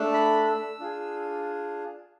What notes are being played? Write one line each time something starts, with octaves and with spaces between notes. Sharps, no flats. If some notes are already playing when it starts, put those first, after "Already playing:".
Already playing: A3 D4 A4
B5
E6
D4 F4 G#4